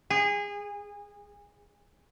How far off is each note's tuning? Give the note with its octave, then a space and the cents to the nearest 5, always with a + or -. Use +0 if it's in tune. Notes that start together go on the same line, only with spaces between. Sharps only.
G#4 -25